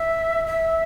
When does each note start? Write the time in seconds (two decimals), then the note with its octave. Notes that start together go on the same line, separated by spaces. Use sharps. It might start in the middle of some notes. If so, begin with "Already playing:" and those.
Already playing: E5
0.47 E5